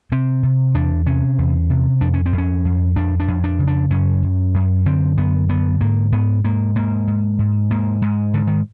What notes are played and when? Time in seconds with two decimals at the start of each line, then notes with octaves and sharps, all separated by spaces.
0.12 C3 C4
0.43 C3
0.74 E2 D4
1.06 C3 C#4
1.38 E2
1.70 C3
2.01 F2 D4
2.14 C#4
2.26 C4
2.33 F2
2.38 C#4
2.65 F2
2.96 F2 D4
3.20 D4
3.28 F2
3.44 D4
3.59 C#3
3.67 D4
3.91 F#2 C#4
4.23 F#2
4.54 F#2
4.86 D3 C4
5.17 F#2 B3
5.49 D3 B3
5.81 G#2 A#3
6.12 G#2 B3
6.44 G#2 A#3
6.76 G#2 A#3
7.07 G#2
7.39 G#2
7.70 G#2 A#3
8.02 G#2 G#3
8.34 G#2 D3
8.47 D#3